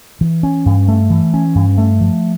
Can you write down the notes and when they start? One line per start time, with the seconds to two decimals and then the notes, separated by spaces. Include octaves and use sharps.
0.21 E3
0.43 C#4
0.66 G2
0.88 A3
1.10 E3
1.34 C#4
1.55 G2
1.78 A3
2.00 F3